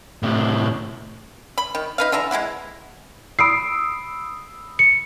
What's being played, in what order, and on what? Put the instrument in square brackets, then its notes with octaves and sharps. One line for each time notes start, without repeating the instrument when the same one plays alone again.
[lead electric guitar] A2 C3
[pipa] B5
D#3
D#4 B4 F5
D3 E3 E5 A#5
G#3 C#4 E4 F#5
[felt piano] B5 D#6 E6 [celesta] C7 D7
[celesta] C#7